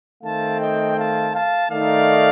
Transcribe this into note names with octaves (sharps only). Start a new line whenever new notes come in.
D#3 A3 C4 F5 A5
D#5 G5
F5 A5
F5 A5
D#3 A3 D#4 D5 F5